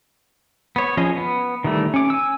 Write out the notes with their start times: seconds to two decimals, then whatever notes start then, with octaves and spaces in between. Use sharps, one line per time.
0.76 B3 C#5
0.97 F3 C#4 G#4 D#5
1.17 B3
1.64 D#3 E3 G3 A3
1.94 C#4 D6
2.10 G#5 E6